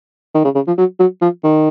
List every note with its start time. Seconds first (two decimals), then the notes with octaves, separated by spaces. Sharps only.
0.35 D#3
0.44 C#3
0.55 C#3
0.67 F3
0.78 F#3
0.99 F#3
1.22 F3
1.44 D#3